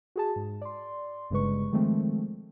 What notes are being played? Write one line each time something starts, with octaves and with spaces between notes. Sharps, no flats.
F#4 G#4 A5
G#2
D5 C6
G1 G2 C#3 G#3 B4 C#6
D#3 F3 G#3 A3 C4